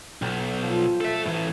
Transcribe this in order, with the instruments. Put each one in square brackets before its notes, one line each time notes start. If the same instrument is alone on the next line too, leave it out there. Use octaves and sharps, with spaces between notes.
[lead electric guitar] B1 [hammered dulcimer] G5 A#5
[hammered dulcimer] F3
[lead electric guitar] A4 E5
A2 E3